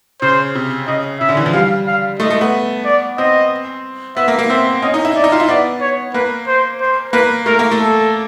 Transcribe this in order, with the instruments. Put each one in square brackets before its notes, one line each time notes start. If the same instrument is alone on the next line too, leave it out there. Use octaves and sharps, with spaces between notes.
[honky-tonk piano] C#3 [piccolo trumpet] C5
[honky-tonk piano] C3
[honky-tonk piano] C#3 [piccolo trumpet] D#5
[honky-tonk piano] C#3 [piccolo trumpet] E5
[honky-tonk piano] D3
E3
F3
[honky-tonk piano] G3 [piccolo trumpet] F5
[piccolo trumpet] F5
[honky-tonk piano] A3 [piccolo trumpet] D#5
[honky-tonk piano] A3
B3
[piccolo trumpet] D5
[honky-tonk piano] C4 [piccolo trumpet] D#5
[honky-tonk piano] B3 [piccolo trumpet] E5
[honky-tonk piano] A#3
A#3
[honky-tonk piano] C4 [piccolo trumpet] E5
[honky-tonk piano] C#4 [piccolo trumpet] D#5
[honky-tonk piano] D#4
E4
[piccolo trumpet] D5
[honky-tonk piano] D#4
F4
E4
[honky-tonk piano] B3 [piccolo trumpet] D5
[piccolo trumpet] C#5
[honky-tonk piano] A#3 [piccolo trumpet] B4
[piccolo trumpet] C5
C5
[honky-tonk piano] A#3 [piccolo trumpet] B4
[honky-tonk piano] A3 [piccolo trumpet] A#4
[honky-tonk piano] A#3
A3
[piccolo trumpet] A4